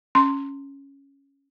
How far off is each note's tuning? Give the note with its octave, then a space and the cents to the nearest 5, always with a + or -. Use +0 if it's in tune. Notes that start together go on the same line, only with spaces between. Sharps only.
C#4 +0 C6 +0